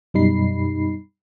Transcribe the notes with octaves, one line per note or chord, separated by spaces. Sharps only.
F#2 B2 G3 D#4 B5 C7